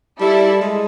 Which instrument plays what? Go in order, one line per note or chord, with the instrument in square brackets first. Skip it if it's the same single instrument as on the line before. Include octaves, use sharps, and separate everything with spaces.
[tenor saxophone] G3 [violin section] E4 A4 D5
[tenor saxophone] G#3